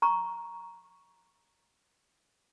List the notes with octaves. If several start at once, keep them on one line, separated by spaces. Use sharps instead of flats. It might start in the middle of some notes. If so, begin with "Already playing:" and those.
A#5 C#6